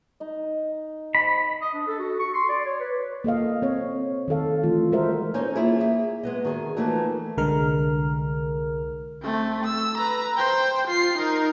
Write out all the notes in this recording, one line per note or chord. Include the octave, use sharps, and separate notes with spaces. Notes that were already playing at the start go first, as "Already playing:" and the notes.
D#4 D#5
C5 D#5 B5
D#5
D4
A4
F#4
C#6
C6
D5
C#5
B4
A#3 A4 D#5 F5
C4 C#5
D#3 C4 A4 F5
E3 A3 F4
G#3 F#4 A#4 C5 E5
C#4 D#4 C5 C#5 D#5
A#3 E4 F4 G#4
A#3 G#4 E5
G#3 B3 D#5
D#3 F#4 G#4
E3 F3 A3 A#3 D#4 F#4
C2 D3 G#3 A#4 F6
A3 C4
E6
B4 A#5
C5 G5
F4 C7
D#4 A#4